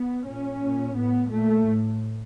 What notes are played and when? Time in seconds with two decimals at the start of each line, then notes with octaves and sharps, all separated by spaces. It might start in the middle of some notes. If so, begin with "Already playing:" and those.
Already playing: B3
0.24 A#2 C#4
0.59 A#2
0.95 A2 B3
1.31 A#2 A3
1.66 A2